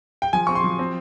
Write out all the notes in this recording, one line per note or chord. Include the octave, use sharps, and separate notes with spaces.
G5
F3 G#5
C4 C#6
C6
F3
C4